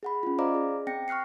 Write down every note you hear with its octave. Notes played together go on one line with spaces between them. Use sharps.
G#4 F#5 B5
C#4 F4
C5 D5 D#5 F5 A#5 D6
G#4
C4 G5 A#6 C#7
C#6 F6 F#6 C7 C#7